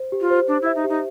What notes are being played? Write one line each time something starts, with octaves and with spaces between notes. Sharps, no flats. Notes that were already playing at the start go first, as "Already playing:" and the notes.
Already playing: C5
G4
F4
C5
D4 C5
E4 E5
D#4
G4
D#4